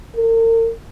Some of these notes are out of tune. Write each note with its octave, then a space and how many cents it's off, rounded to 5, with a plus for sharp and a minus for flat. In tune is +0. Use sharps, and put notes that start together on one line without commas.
A#4 -40